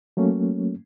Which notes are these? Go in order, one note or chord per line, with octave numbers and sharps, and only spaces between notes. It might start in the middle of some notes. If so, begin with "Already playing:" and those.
F#3 A3 A#3 C#4